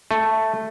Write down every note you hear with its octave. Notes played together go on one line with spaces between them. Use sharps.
A3